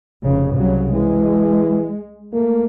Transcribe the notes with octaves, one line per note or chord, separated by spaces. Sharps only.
F1 C#3
C2 C#3 F#3
E3 G#3
A3 A#3